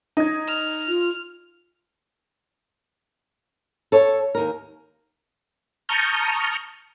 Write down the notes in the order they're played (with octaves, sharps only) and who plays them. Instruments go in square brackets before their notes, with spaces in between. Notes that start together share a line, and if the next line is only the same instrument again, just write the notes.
[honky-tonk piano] D#4 G#6
[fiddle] F6
[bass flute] F4
[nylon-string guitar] A4 C#5
D#2 A#4
[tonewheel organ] A5 A#5 C#6 D#6 F6 G6